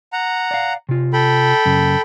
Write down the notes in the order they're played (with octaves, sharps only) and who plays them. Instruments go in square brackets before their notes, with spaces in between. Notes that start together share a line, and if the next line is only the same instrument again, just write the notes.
[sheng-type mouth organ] F#5 A#5
[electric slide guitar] D5 F5
C3 F4
[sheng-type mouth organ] A4 G5 B5
[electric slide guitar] F#2 C#3